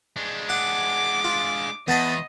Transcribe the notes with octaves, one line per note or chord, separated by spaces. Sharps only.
G#3 D4
F#5 D6
F4
E2 B3 D#5 A5 B5